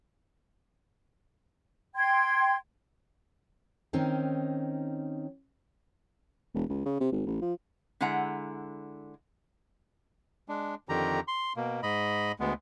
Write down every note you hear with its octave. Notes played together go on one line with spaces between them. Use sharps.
G5 C6 G#6
D#3 C4 C#4 D#4
E1
C#2
C#3
C3
G#1
A1
F3
D3 G#3 E4 F#5 A#5
G#3 D4
F2 D3 D#3 G4 A#5
C6
B2 A#3
G#2 D#5 B5
D2 G#3 B3